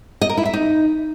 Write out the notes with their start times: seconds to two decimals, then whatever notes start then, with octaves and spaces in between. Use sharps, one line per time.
0.22 D#5
0.29 A#4
0.37 E4
0.45 E5
0.53 D#4